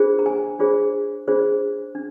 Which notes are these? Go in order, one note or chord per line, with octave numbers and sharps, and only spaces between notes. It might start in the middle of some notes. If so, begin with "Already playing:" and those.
Already playing: D4 F4 G#4 C5
A#5
G#5
D4 F4 G#4 C5
D4 F4 G#4 C5
D4